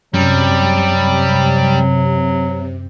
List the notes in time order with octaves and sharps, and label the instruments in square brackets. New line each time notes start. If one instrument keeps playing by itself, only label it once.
[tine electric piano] F#2 [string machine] C3 [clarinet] F#3 [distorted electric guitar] G3